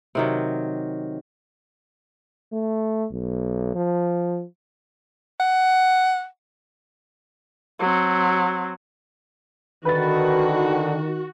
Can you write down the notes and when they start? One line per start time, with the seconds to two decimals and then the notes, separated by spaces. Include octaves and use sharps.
0.15 C3 D#3 F#3
2.52 A3
3.12 B1
3.75 F3
5.40 F#5
7.80 F#3 C4
9.85 D3 D#3 F#4 B4 A6